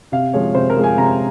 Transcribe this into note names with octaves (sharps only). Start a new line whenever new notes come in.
C3 F5
F3 G#3 C#5
C3 C5
A#4
F3 G#3
G#5
C3 A#5